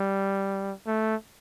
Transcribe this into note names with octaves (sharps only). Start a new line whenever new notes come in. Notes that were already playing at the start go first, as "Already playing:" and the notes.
Already playing: G3
A3